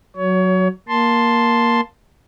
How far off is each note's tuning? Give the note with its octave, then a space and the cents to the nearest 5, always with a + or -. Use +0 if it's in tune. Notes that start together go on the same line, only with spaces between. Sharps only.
F#3 +0 C#5 +25
A#3 +10 A5 +0 C6 +0